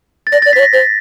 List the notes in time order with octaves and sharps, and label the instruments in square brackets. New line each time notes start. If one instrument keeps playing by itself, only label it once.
[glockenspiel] A6
[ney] D5 [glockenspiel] A#6
[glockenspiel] A6
[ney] D5
[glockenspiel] B6
[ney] C5
C#5
[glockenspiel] A#6
[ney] C5 [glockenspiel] A6